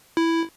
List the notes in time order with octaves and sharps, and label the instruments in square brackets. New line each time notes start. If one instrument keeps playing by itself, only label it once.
[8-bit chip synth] E4